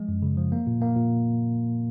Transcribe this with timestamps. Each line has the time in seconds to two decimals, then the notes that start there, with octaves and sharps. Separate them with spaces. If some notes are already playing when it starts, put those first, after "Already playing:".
Already playing: F3 G#3
0.08 F#2
0.22 C#3
0.37 F3
0.52 A#3
0.67 A#2
0.81 A#3
0.96 A#2